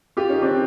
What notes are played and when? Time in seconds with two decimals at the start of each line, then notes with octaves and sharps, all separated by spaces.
0.17 F4 G4
0.29 C#4 D#4
0.42 C4 D4